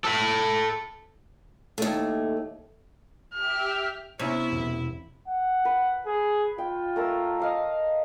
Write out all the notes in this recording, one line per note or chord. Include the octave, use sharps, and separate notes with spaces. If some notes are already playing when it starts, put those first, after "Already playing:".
A4 B5
D#2 A3
G4 E5 G5 F6
C3 B3 C#4 E4 E5
E1 E2
F#5
B4
G#4
F4 G5
A3 A#4 E6
D#5 F5 A#5